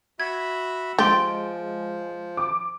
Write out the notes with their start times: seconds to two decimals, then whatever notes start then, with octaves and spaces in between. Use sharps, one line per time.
0.20 F#4 E5 B5 G#6
0.99 F3 G#3 G4 C6 A6 D7
2.37 D6